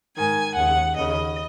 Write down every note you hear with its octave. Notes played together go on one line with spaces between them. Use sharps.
G#2 D#3 G#5
D#2 C#3 F#5
D#2 C#3 D#5